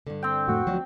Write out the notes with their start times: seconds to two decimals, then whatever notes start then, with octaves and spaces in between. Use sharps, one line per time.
0.07 G2 D3
0.23 C4 G5
0.48 F2 A2 A3 F#4
0.67 D2 F3 F#3